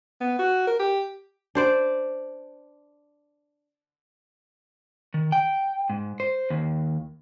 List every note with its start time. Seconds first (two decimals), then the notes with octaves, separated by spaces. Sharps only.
0.21 B3
0.39 F#4
0.67 A#4
0.79 G4
1.55 D4 C5 D5
5.14 D#3
5.32 G5
5.90 G#2
6.20 C5
6.50 D#2